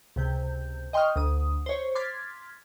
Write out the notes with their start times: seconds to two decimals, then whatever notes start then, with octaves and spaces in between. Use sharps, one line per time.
0.16 C#2 C3 G6
0.93 D#5 G5 C6 C#6 D#6 F6
1.16 D2 D#6
1.66 C5 C#5
1.95 C6 D6 F6 G#6 A6 B6